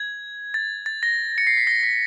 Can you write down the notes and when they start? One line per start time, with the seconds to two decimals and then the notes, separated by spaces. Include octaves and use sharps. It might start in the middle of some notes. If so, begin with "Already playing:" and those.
Already playing: G#6
0.54 A6
0.86 A6
1.03 A#6
1.38 C#7
1.47 C7
1.57 B6
1.67 A#6
1.83 B6